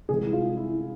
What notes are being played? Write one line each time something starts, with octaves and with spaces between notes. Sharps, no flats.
C2 C3 E3 G#3 G#4
E4
F4
E4